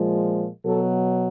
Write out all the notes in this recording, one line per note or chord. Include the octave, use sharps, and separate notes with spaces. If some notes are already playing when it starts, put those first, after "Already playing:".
Already playing: A#2 F3 G#3
B2 F#3 A4